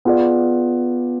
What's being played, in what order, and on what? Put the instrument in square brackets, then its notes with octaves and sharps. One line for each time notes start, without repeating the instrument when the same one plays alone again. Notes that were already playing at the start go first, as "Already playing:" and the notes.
[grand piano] B3 F4 G#4 D5